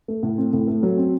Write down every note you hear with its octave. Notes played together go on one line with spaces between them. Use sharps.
A3
A2
C4
A2
A3
F#3
C4